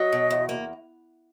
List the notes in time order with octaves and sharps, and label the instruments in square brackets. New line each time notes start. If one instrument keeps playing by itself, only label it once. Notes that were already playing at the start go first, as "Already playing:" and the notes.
Already playing: [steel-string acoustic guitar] F#3 [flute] D#5
[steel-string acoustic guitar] B2
E2
A#3